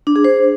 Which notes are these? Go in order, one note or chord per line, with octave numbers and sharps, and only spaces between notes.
D4
G#4
C5